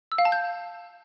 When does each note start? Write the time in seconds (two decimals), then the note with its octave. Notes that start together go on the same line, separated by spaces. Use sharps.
0.12 E6
0.18 F5
0.25 A5
0.32 G6